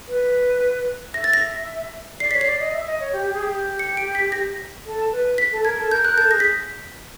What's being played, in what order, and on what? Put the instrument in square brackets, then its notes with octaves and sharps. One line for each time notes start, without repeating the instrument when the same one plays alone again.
[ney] B4
[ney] E5 [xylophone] A#6
[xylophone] A6
A#6
[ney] D5 [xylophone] C7
[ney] C#5 [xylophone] B6
[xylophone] C7
[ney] D5
D#5
E5
D#5
C#5
G4
G4
G#4
G4
[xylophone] C#7
D7
B6
A#6
[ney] A4
B4
[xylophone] B6
[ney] A4
[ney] A#4 [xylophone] G#6
[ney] A4
[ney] A#4 [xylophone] G6
[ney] A#4 [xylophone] F#6
[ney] A4 [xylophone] G6
[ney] G#4 [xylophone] A#6
[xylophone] B6